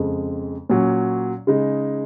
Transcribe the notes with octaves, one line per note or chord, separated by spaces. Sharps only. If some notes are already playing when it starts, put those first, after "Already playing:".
Already playing: F2 C#3 G#3
A#2 F#3 C#4
C#3 G#3 D#4